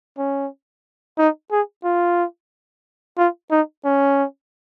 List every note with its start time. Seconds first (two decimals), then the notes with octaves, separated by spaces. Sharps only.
0.18 C#4
1.18 D#4
1.51 G#4
1.84 F4
3.18 F4
3.51 D#4
3.84 C#4